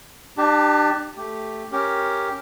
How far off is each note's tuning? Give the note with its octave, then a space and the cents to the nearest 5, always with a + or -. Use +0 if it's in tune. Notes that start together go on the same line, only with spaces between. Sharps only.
D4 +35 G4 +0 A5 +0
A3 +0 G4 +0
C#4 +0 G4 +0 A#4 +0